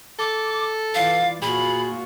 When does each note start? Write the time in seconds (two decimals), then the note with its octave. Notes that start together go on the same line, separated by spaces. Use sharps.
0.19 A4 D6
0.95 E3 F4 D5 F5
1.42 A#2 F4 F#4 G#4 B5